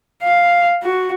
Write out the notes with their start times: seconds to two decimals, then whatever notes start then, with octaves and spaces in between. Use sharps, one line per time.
0.23 F5
0.83 F#4